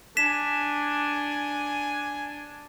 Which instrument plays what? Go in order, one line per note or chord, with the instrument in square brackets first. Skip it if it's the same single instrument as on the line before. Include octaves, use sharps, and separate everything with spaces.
[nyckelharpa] D4 [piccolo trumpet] G#5 [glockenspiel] B6 E7